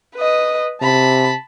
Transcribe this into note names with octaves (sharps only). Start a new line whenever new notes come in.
B4 D#5
C3 A5 B5